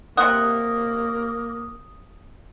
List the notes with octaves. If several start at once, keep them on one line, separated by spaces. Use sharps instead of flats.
C3 A#3 F#5 D#6